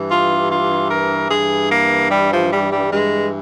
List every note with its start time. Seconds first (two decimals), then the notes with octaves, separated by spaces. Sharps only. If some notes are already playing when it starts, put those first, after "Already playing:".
Already playing: G2 E3
0.10 F4
0.50 F4
0.90 A#4
1.30 G2 E3 G#4
1.71 A#3
2.11 G3
2.32 F3
2.52 G3
2.72 G3
2.92 G2 E3 G#3